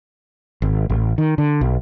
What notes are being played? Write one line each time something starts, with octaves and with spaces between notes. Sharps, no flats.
G#1
A1
D#3
D3
B1